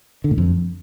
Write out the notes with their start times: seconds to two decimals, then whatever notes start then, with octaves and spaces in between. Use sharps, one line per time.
0.24 D3
0.31 A2
0.38 F2